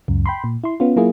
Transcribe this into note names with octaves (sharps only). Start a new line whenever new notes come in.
C#2 F#2
G5 B5 C6
A#2
E4 C6
B3 C#4 F4
F#3 A#3 E4 F4 G#4